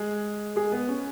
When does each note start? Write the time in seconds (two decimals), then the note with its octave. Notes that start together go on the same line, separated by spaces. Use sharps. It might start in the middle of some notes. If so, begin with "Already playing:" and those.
Already playing: G#3 G#4
0.56 G#3 G#4
0.72 B3 B4
0.89 C#4